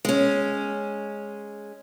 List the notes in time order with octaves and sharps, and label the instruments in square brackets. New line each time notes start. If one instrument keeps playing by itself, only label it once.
[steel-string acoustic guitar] G#3 C#4